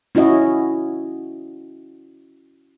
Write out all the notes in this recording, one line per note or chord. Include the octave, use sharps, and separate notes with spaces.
C#4 E4 F#4 D#5